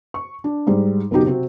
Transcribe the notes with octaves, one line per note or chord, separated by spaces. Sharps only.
C#6
D4
G#2 G3
F#1 B2 F#3 D#4 G4
C3 C4 F#4